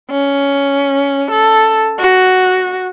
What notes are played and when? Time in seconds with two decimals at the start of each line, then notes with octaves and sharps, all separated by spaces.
0.11 C#4
1.32 A4
1.99 F#4